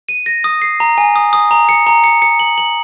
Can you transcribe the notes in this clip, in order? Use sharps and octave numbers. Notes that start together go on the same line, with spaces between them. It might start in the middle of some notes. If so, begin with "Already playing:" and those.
D#7
A#6
D#6
C7
A#5
G#5
D#6
D#6
A#5
C#7
A#5
C#7
C#7
F#7
F#7